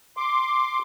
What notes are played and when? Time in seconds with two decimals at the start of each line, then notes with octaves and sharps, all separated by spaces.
0.17 C6 D6